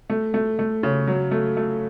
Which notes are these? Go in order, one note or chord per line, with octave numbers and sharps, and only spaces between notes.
A3
A3
A3
C#3
F#3
A3
A3